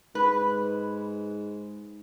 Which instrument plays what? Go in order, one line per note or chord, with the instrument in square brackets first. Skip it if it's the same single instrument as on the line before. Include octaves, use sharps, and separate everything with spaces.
[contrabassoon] G#2 [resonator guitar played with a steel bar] B4